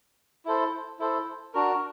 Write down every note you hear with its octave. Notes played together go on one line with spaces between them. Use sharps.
E4 A4 C5
E4 A4 C5
D4 F#4 A#4